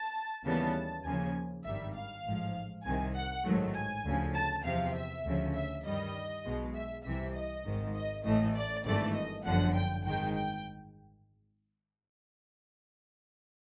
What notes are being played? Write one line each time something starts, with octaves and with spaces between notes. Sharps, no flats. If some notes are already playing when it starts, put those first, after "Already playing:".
Already playing: A5
D#2 C#3 E3 G3 B3 A5
D#2 C#3 F3 A#3 G#5
G#1 G2 D#3 G3 E5
F5
A1 G#2 F3
C2 C3 D#3 G#5
F#5
A1 G#2 D#3 F#3 A3
G#5
D2 C#3 F3
A5
E2 C3 F3 F5
E5
D2 C#3 F3
E5
G2 D#3 G3 D#5
B1 B2 G#3
E5
C2 C3 E3 E5
D#5
G#1 G#2 D#3
D#5
A1 A2 E3 A3 D#5
D5
G#1 G2 E3 A3 D5
D#5
G1 F#2 D3 F3 F#5
G5
G#1 G#2 D#3 G#3 G5
G5